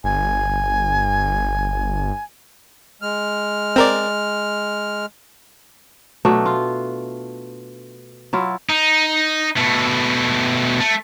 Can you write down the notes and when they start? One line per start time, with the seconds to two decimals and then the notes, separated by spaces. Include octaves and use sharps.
0.04 G1 G#5
3.02 G#3 F6
3.76 C4 A#4 D5
6.25 B2 F#3 A3 D4
6.46 F4
8.33 F#3 E4 F4
8.70 D#4
9.57 B2 A3
10.80 A3